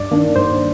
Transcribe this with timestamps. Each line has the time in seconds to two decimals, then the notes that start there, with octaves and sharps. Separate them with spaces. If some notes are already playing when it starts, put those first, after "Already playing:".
Already playing: G2 D5
0.11 D#3 A#3 D4
0.36 G2 C5